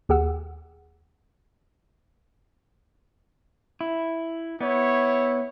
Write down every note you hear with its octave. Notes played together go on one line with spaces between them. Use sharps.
D#2 G4 G#4 F#5 E6
E4
B3 E4 C#5